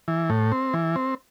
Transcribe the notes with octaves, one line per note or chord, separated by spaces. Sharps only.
E3
A2
C4
E3
C4